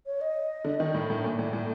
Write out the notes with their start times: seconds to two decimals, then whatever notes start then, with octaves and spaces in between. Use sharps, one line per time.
0.06 C#5
0.21 D#5
0.65 D3
0.80 D#3
0.94 A2
1.10 A2
1.24 A#2
1.39 A2
1.53 A2